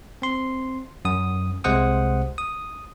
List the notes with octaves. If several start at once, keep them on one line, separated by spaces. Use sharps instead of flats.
C4 C6
F#2 D#6
C2 C3 G#3 C5 F#5 D#6
D#6